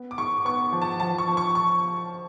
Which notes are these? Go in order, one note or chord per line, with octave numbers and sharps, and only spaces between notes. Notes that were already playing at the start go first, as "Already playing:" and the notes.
Already playing: B3
D6
G#2 C#6
B3 C#6
F3
A5
F3 A5
C#6
F3
C#6
C#6